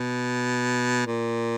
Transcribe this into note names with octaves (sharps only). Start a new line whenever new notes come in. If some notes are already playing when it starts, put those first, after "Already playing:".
Already playing: B2
A#2